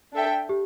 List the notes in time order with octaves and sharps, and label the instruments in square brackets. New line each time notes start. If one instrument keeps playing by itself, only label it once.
[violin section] D4 A4 E5 G5
[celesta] G4